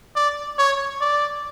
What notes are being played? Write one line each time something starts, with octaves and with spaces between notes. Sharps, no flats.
D5
C#5
D5